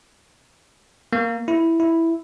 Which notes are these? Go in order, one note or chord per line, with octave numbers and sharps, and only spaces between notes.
A#3
E4
E4